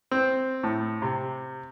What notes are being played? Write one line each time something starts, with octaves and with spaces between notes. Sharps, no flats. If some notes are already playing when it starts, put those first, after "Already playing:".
C4
A2
C3